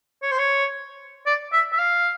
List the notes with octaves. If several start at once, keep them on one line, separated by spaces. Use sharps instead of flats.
C#5
C5
C#5
D5
E5
E5
F5